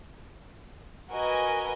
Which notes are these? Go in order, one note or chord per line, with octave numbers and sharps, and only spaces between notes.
F#4 A#4 B4 D#5 G#5